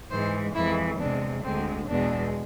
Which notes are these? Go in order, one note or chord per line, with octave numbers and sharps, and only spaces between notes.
G#2 E3 G#3 C5
F2 E3 G#3 E4
E2 C3 G#3 D4
D2 D3 G#3 C4
E2 B2 G#3 D4